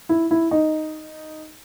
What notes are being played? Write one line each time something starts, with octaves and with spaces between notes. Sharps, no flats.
E4
E4
D#4